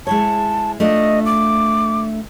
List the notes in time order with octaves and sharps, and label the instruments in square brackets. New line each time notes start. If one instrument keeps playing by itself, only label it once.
[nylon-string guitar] G#3 E4 C#5 [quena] A5
[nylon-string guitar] A3 D4 F4 [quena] D#5
[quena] D6